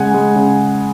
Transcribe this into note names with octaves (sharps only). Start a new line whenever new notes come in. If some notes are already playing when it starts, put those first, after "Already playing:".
Already playing: C#3 G#3 F#5 G#5
G#3
C#3